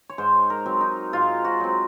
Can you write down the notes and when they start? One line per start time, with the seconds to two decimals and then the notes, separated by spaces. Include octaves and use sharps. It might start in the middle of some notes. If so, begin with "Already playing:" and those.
0.09 C#5
0.18 G#2 C5
0.50 A#4
0.66 F#3 C4
0.81 D#4
1.13 G#2 F4
1.45 F#4
1.60 F#3 C4